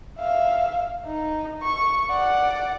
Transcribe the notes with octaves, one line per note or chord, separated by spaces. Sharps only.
E5 F5
D#4
C#6
D5 F#5